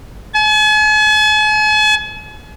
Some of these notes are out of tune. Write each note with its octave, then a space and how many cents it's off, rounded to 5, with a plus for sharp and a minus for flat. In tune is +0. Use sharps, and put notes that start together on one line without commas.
G#5 +45